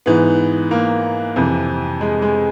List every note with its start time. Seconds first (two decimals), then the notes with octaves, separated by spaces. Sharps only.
0.06 G#2 E3 B3
0.71 A#3
1.36 F2 C3 E3
2.01 G#3
2.22 G#3